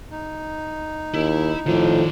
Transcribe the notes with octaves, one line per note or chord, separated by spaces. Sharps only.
D#4
D#2 E4
F2 A2 D#3 F3 D5